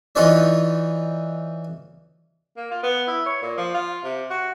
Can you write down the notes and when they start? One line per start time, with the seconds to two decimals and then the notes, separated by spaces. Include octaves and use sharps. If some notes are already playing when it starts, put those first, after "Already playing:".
0.15 E3 D#4 F4 B4 C#5 D5
2.56 A#3
2.71 F4
2.83 B3
3.08 E4
3.26 C#5
3.42 A#2
3.57 F3
3.74 F4
4.04 C3
4.30 F#4